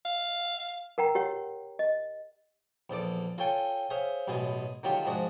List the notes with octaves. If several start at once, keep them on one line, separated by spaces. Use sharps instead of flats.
F5
A#4 F#5 G5 A#5
G4 C#5 F#5
D#5
A#1 E2 A4 D6
F4 A4 C#5 G5 G#5
G#4 C5 C#5 E5 F5
A1 F#2 B2 G#4 G#5
D3 D#3 F#3 F4 G4 C#5
G#2 F3 D4 F#4 G#4